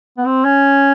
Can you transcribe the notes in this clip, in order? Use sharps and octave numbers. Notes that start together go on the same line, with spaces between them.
B3
C4
C#4